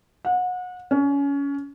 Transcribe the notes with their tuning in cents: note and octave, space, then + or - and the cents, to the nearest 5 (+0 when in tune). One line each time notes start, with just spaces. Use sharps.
F#5 -30
C#4 +25